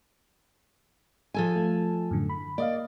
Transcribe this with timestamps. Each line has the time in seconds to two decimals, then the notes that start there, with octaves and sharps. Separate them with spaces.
1.34 F3 A4 G#5
1.56 A3
2.11 F#2 A2 D3
2.30 B5
2.58 A#3 D5 D#5 F5